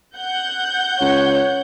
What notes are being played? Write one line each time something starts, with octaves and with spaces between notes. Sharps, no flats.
F#5 G6
C#2 C#5